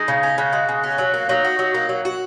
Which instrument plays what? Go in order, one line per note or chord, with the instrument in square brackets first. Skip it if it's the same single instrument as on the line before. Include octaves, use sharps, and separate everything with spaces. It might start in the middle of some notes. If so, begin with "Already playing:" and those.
Already playing: [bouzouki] G#3 [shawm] D#4
[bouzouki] C#3
C#4
[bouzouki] C#3 [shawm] F#4
[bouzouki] G#3
C#3
C#4
[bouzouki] F#3 [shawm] F#4
[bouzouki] A#3
[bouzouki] F#3 [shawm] D#4
[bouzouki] F#4
F#3
A#3
F#3
F#4